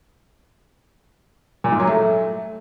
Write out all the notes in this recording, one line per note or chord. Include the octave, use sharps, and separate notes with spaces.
A#2
G#2
F#3
A3